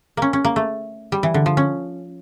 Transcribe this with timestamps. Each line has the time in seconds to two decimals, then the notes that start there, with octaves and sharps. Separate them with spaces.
0.17 A#3 C#4
0.33 C#4
0.44 A#3
0.56 A3
1.12 G3
1.23 E3
1.34 D3
1.46 F3
1.57 C#4